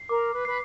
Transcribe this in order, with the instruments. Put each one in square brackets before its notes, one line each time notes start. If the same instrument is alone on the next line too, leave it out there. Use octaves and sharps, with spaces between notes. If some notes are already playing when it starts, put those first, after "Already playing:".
Already playing: [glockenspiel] C7
[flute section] A#4 [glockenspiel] D6
[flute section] B4
[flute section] B4 [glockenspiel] C7